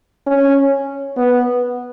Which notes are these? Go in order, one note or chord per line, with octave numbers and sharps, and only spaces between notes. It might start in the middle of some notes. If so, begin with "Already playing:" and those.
C#4
B3